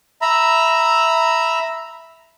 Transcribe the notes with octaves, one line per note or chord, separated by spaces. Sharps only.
E5 A#5 B5